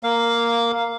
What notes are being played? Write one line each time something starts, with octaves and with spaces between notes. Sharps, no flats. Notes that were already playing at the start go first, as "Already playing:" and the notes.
A#3 F5